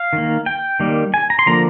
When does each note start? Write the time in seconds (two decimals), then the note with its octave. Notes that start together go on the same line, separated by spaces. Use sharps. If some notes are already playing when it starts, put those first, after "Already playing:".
Already playing: F5
0.13 D#3
0.18 A#3
0.46 G5
0.80 D#3 G3 A#3
1.14 G#5
1.30 A#5
1.39 C6
1.46 D3 F3 A#3 A#5